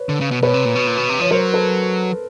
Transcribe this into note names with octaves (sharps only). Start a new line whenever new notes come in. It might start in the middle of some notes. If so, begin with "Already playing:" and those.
Already playing: B4 C#5
D3
C#3
B2
B2 B4 C#5
C3
A#2
B2
A#2
B2
C3
F3 C#5
F#3 A#4 C5
A4 B4